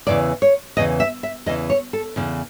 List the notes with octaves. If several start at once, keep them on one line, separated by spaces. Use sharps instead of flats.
E2 C#3 E3 D5
C#5
E2 C#3 E3 D#5
E5
E5
E2 C#3 E3 D#5
C#5
A4
E2 C#3 E3